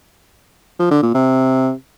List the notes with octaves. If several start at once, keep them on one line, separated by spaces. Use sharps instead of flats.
F3
D3
A#2
C3